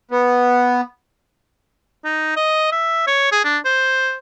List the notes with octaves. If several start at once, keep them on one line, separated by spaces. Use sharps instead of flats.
B3
D#4
D#5
E5
C#5
G#4
D4
C5